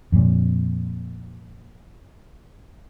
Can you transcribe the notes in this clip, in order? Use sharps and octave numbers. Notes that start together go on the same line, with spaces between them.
F2 A#2